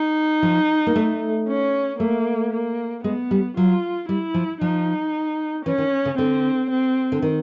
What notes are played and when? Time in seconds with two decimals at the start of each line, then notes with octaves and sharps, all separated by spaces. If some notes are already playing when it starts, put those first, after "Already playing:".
Already playing: D#4
0.43 F3
0.87 A#3
0.96 A3
1.48 C#4
1.99 A3 A#3
2.52 A#3
3.04 G#3 B3
3.31 G3
3.56 F#3 F4
4.08 G3 E4
4.34 F3
4.61 F3 D#4
5.65 E3 C#4
5.78 D#3
6.05 C#3
6.18 D3 C4
6.70 C4
7.12 D3
7.22 D#3